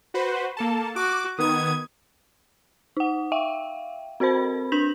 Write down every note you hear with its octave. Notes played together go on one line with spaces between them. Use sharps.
F#4 B4 C5
A#3 A4 A5
F#4 D6
D#3 B3 D#6 G#6
D#4 F#5
E5 F5 G5
C4 F#4 A#4 C5 B5
D4 G6 B6 F7 F#7